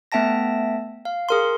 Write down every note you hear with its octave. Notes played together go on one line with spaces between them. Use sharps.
A3 B3 E5 G5 A5 A#6
F5
G#4 A#4 C6